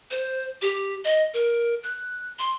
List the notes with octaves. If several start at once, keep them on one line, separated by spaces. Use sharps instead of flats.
C5
G4
D#5
A#4
F#6
C6